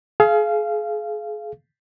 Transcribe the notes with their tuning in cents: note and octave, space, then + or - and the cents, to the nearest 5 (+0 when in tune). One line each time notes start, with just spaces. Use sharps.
G#4 +35 F5 -20